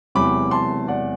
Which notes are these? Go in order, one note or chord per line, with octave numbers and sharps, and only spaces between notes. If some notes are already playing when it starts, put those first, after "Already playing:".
E1 E2 C3 F#3 B5 D6
A5 C6
D5 F#5